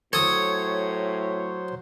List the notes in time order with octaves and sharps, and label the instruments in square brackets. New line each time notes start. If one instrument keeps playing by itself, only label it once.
[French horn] A2 [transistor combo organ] F#3 C5 [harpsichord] A4 D#6 [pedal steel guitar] C#5